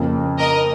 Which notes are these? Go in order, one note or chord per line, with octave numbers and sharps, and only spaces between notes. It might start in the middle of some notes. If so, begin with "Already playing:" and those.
Already playing: F2 C#3 A#3
A#4 D#5